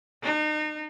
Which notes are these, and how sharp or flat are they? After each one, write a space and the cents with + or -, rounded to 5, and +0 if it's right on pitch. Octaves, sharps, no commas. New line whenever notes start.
D#4 -35